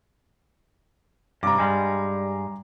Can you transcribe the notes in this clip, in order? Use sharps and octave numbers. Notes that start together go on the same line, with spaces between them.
G2 C3 A#5 D6
G2 G3 G#3